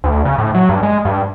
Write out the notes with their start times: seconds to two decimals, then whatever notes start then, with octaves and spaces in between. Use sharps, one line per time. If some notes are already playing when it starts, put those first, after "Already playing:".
0.04 D2
0.25 C#3
0.38 A2
0.55 F#3
0.69 G2
0.83 G#3
1.05 G2